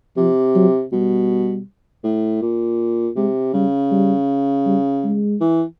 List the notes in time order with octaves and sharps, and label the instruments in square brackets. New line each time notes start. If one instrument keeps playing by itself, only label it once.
[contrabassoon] C3 [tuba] F3
[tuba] F#3
[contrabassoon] B2 [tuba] G3
[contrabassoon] A2
A#2
[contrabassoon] C3 [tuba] G#3
[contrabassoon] C#3 [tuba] G3
[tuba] G3
G3
G#3
[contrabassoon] E3